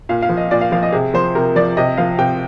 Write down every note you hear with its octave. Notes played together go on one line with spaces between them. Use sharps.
A#2 F5
F5
F3
D#5
A#2 D5
F5
F3 F5
D#5
C3 G#4
F3 C5
C3 A#4
F3 D5
C3 D#5
F3 F5
C3 G5